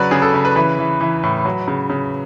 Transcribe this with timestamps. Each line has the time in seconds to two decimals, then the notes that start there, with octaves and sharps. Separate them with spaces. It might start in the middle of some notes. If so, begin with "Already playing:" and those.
Already playing: C#3 F#3 B4 C#5 D5
0.11 C#3 G#4
0.22 A4
0.34 C#3
0.45 B4
0.56 E3 B4
0.79 E3
1.01 E3
1.23 A2
1.45 F#3
1.68 C#3
1.90 C#3